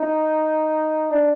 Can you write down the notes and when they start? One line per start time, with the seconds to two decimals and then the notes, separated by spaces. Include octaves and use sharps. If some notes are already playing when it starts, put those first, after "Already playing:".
Already playing: D#4
1.11 D4